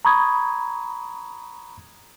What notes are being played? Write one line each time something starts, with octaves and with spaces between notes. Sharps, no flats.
A#5 B5 C#6 D#6 G#6